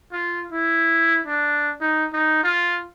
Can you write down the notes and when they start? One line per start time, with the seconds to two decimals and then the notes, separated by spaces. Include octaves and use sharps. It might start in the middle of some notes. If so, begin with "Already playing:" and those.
0.12 F4
0.52 E4
1.27 D4
1.81 D#4
2.13 D#4
2.43 F4